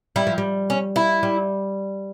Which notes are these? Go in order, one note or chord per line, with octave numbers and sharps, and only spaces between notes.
G3 E4
F3
G3
C#4
E4
G3